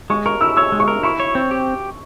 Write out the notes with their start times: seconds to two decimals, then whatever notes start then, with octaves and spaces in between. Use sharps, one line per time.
0.10 G#3 C#6
0.26 A#4 C#6
0.41 E4 E6
0.57 C#5 E6
0.72 G#3
0.80 C#6
0.88 A#4
1.03 E4 C#6
1.20 C#5
1.35 C4
1.51 G4